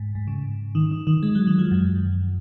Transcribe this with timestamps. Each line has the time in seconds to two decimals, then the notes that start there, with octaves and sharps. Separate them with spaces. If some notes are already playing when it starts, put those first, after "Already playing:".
Already playing: G#2
0.15 G#2
0.27 C#3
0.75 D#3
0.91 D#3
1.07 D#3
1.23 G#3
1.35 F#3
1.47 D#3
1.58 F3
1.71 F#2